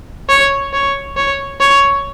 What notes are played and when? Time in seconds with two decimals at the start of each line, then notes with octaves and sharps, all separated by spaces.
0.29 C#5
0.73 C#5
1.17 C#5
1.60 C#5